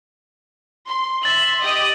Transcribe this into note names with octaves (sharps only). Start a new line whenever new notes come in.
C6
E5 C6 A6 F#7
G4 D#5 D#6